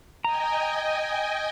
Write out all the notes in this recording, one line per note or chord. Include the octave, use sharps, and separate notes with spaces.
D#5 G5 G#5 A#5